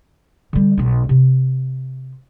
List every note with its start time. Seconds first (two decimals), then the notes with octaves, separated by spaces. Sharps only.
0.53 D3 G3
0.78 B1 D#4
1.09 C3